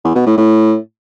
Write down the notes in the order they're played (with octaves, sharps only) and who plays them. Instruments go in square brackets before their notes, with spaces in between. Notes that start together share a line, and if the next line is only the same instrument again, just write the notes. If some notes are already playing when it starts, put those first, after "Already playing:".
[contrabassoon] E2
B2
A2
A2